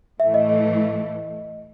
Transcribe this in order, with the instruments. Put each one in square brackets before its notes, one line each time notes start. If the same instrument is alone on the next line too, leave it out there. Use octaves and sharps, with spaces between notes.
[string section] A2 E3 A3 [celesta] E5
[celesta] D#5
D#5